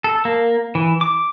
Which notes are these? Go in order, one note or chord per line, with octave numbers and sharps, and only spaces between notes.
A4
A#3
E3
D6